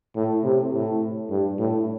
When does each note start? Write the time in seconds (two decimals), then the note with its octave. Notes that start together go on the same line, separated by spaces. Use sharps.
0.16 A2
0.44 C3
0.73 A2
1.30 G2
1.59 A2